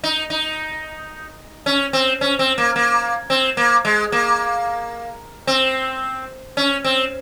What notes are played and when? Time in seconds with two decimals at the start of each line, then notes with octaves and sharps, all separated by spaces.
0.04 D#4
0.30 D#4
1.66 C#4
1.93 C4
2.21 C#4
2.39 C4
2.58 A#3
2.76 A#3
3.30 C4
3.57 A#3
3.85 G#3
4.12 A#3
5.47 C4
6.57 C#4
6.84 C4